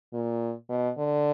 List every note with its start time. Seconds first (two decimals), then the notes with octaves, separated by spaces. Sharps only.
0.13 A#2
0.70 B2
0.98 D3